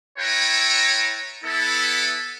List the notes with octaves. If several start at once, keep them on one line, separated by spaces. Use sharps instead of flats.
E4 A4 B4 C#5 G5 A#5
B3 E4 A4